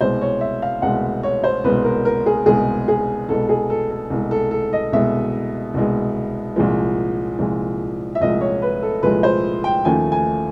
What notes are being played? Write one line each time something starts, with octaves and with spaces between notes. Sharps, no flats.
C2 B2 G#3 C5
C#5
E5
F5
C2 B2 G#3 F#5
C#5
C5
C2 B2 G#3 B4
A#4
A#4
G#4
C2 B2 G#3 G#4
G#4
C2 B2 G#3 A4
G#4
A4
A4
C2 B2 G#3
A4
A4
D#5
C2 B2 G#3 E5
C2 B2 G#3
C2 A#2 F3 G#3
C2 A#2 F3 G#3
E5
C2 A#2 F3 G#3 D#5
C#5
B4
A4
C2 A#2 F3 G#3 B4
C5
G5
D#2 C#3 F3 A3 G#5
G#5